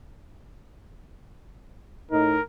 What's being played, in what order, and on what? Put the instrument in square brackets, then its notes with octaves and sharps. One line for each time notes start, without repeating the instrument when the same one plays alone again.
[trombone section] A2 D#4 [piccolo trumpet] A#4